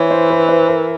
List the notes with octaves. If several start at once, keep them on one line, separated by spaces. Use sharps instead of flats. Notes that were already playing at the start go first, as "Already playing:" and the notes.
Already playing: E3 C5 C#5
C5
B4
C5
A#4